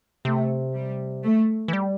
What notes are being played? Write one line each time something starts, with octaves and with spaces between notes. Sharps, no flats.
C3 A3
G3
A3
E3
G3